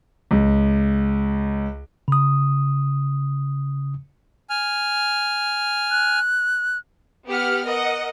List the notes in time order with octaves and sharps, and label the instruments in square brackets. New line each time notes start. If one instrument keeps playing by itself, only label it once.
[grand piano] C#2
[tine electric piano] C#3 D#6
[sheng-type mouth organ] G#5 F6
[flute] F#6
[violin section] B3 G4 F#5 F6
A#4 D#5 F#5